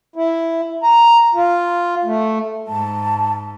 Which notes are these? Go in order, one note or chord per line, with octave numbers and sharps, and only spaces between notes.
E4
A#5
F4
A3
G#2 A5